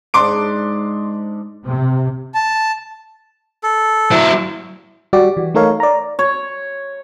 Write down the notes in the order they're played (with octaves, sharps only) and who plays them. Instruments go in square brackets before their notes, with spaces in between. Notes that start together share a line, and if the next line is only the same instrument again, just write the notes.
[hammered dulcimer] G#2 D4 [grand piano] C6 D6 D7
[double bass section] C3
[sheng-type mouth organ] A5
[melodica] A4
[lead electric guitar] F#3 E4
[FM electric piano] G3 F#4 G4 D5
E3
A3 D#4 A4 A#4 C#5 F5
D5 A#5
[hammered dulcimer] C#5